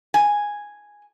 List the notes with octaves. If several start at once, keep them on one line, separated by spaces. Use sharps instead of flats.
G#5